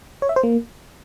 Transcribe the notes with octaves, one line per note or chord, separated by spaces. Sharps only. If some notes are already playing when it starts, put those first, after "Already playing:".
C#5
E5
C5
A#3